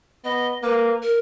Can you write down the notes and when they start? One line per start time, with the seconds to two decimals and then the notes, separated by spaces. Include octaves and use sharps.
0.24 B3 D#5
0.63 A#3 B4
1.02 A#4